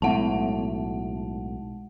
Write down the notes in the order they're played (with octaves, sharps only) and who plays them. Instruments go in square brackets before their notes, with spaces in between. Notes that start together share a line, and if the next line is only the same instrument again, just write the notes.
[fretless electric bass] B1 A2 [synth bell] G#3 F#5 A5